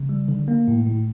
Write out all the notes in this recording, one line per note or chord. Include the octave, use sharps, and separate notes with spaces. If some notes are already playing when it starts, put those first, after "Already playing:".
Already playing: C#3
G3
D3
A#3
A2
A2